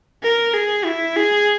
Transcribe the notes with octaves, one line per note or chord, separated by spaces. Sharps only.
A#4
G#4
E4
G#4